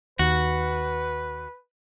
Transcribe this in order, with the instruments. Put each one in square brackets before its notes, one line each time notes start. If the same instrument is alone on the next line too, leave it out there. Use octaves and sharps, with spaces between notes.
[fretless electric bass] D#2 [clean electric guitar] F#4 [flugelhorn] B4